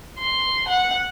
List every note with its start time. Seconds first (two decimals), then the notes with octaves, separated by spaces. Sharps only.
0.18 C6
0.68 F#5